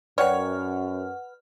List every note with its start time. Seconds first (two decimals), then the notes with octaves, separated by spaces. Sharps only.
0.18 F#2 B4 C#5 D5 F#5 G5 F6